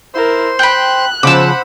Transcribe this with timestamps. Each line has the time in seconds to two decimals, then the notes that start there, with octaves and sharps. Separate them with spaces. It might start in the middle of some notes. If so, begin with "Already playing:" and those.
0.14 E4 A#4 C5 C6
0.59 G5 B5 F#6
1.23 C#3 F3 C5 F#5 B5 D6 E6